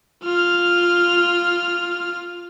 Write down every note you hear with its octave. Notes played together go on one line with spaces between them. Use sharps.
F4 F6